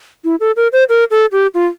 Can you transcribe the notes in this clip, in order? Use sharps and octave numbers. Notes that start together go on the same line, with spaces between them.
E4
A4
A#4
C5
A#4
A4
G4
F4